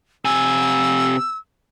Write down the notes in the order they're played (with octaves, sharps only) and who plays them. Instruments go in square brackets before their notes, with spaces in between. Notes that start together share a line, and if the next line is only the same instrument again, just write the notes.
[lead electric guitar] C3 G#5 [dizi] E6